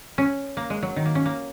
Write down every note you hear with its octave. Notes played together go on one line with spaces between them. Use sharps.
C#4
A#3
G#3
F#3
D#3
A#3
C#4
A#3